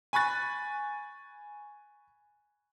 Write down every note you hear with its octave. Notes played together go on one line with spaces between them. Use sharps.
G#5 B5 C#6 F#6 A6